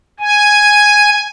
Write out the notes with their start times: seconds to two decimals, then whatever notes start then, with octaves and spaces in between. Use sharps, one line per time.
0.20 G#5